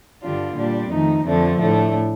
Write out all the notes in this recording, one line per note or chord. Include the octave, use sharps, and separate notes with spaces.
G2 D3 G3 D4 F4
A#2 G3 D4
F2 D#3 A3 D#4
F2 D3 F3 A3 D4
A2 A3 D4